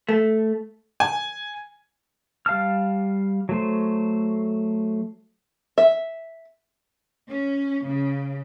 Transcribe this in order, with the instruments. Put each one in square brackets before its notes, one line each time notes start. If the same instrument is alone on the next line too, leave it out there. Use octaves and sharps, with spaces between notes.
[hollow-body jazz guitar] A3
[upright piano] G#5
[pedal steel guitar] G3 F5 A5 F6
F#3 A3 C5
[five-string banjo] E5
[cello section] C#4
C#3